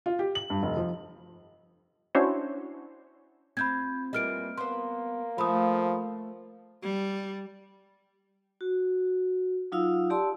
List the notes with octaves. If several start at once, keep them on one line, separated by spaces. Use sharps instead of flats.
F4
G4
F#7
G2
F1
F3
C#4 D4 E4 F#4 C5 C#5
C4 F4 B5 G6 G#6
E3 G3 A#3 F4 D#5 F6 D7
A#3 B3 C5 C6
F3 A3 B5 D#6
G3
F#4
F#3 D#4 F4 F5 E6
G4 D5 A5 C6 E6